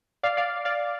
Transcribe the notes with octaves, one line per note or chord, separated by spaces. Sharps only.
D5 F5
D5 F5
D5 F5